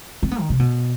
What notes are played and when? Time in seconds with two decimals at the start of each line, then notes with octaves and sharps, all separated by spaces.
0.23 C4
0.31 B3
0.40 D#3
0.50 C3
0.59 B2